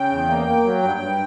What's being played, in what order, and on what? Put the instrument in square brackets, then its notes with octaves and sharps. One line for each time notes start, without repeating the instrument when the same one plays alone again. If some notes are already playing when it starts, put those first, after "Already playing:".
Already playing: [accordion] C#3 G5
E2
A#3
A#3
F#3
G2
G2